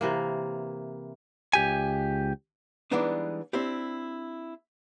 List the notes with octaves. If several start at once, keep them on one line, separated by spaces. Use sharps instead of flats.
C3 E3 A#3
C#2 G4 G#5
E3 G3 G#3 B3 D4 D#4
C4 D4 E4 G4